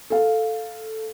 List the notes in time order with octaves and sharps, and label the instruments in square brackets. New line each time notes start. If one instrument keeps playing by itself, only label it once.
[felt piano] A4 F5